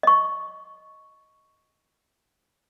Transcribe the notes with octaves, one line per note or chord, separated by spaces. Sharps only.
D#5 C#6